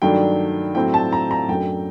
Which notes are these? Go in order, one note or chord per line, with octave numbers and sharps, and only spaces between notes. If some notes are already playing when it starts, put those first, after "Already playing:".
G2 D#3 F#3 A3 D4 G5
A2 F#3 C4 G5
A5
A#5
A#5
F#2 F#3 A3 D4 G5